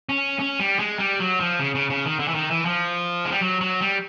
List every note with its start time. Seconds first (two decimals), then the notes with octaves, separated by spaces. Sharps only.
0.09 C#4
0.40 C#4
0.60 G3
0.79 G#3
0.99 G3
1.20 F#3
1.40 F3
1.60 C#3
1.75 C#3
1.90 C#3
2.06 D#3
2.19 D3
2.28 E3
2.34 D#3
2.51 E3
2.65 F3
3.25 G#3
3.32 G3
3.41 F#3
3.61 F#3
3.81 G3